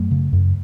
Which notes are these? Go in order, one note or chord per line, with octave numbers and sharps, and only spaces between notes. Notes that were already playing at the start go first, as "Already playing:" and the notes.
Already playing: F#2 F#3 A3
C#3
F#2